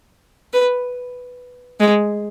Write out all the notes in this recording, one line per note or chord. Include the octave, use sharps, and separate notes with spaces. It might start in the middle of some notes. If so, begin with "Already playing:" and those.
B4
G#3